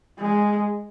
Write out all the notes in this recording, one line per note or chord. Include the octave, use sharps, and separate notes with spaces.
G#3